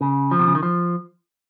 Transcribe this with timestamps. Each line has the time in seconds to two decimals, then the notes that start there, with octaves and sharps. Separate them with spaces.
0.01 C#3
0.31 F3
0.39 C3
0.47 C#3
0.55 D#3
0.63 F3